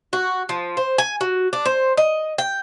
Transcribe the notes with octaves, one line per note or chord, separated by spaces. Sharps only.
F#4
F3
C5
G#5
F#4
D4
C5
D#5
G5